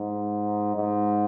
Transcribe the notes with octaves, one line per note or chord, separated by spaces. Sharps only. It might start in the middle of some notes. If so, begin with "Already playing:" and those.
Already playing: G#2
G#2